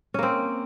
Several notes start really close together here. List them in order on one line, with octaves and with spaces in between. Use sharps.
C#4 A#3 C4